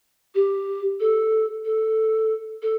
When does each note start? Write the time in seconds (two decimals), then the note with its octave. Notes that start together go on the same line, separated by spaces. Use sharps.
0.35 G4
1.00 A4
1.65 A4
2.62 A4